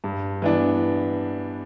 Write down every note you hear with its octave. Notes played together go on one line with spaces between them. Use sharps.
G2
E3 B3 D4